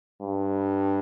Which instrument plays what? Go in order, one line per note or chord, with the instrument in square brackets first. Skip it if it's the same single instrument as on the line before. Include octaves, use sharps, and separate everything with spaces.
[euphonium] G2